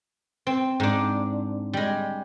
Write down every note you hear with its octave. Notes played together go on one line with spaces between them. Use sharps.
C4
G#2 D4
G3 G#3